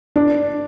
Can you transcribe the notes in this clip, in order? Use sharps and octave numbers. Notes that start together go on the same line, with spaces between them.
D4